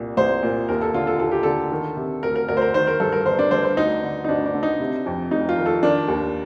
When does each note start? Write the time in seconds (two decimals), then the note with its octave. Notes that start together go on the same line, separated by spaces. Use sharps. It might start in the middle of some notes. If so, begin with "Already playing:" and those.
Already playing: C2 A#2
0.17 C2 C5
0.43 A#2
0.69 D#2 A#4
0.81 A4
0.94 D3 F4
1.07 A4
1.19 D#2 A4
1.31 G4
1.43 D3 A4
1.72 D#3
1.97 C3
2.23 D2 A#4
2.36 A#4
2.48 D2 A#4
2.57 C5
2.62 A#4
2.74 D#3 C5
2.87 A#4
3.00 G2 A4
3.12 A#4
3.25 G1 C5
3.39 D4
3.51 G1 C5
3.64 C5
3.77 D2 D#4
4.03 D3
4.24 D#4
4.29 D2 D4
4.46 D4
4.54 D3
4.63 D#4
4.80 C3
5.06 F2
5.31 F1 D#4
5.49 F4
5.57 D#3
5.66 A4
5.83 D#3 D4
6.08 D#2